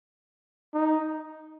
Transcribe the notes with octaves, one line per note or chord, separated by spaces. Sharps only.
D#4